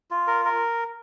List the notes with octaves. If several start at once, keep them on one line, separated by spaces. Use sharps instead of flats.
F4
A#4
A#4